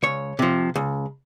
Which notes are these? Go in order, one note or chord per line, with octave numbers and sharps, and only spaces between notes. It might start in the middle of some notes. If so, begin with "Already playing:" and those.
C#2 C#5
C3 F3
C#2